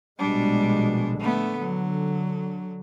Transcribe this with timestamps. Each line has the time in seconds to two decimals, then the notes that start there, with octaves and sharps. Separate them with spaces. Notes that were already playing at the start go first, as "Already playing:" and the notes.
0.18 A#1 B2 G3 G#3 D4
1.20 D3 A3 B3
1.60 F#3